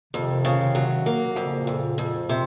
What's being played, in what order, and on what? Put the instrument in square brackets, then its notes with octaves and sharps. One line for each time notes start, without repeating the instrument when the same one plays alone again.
[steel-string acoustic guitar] F2 [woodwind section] C3 D#3
[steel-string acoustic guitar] C#3
F#3
A#3
[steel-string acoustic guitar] F2 [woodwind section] A#2 C#3
[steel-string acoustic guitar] F2
F2
C3